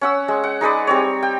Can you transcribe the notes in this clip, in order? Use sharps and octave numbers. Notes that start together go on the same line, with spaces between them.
C#4 F#5 E6
G#3
F#5
D#4 G#4 B4 D5
G3 C4 C#5
G5